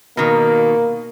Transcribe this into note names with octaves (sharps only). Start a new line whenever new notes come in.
B2 D#3 A#3